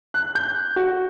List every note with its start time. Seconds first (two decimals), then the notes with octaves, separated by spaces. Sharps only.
0.14 F#6
0.35 G6
0.76 F#4